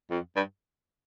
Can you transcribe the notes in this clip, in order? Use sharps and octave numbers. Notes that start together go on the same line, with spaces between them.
F2
G2